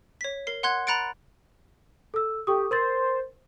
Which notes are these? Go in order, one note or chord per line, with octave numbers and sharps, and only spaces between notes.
C#5 B6
A#4 C7
F#5 C6 F#6 G#6
A#5 B5 F#6 A6 C#7 D7
A4 E6
G4 A4 C#6 D#6
A#4 C5 C6 A6